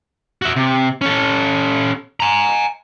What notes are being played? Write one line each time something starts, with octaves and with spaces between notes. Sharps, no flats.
F#4 E5
C3
C#4 A4
G#5 A#5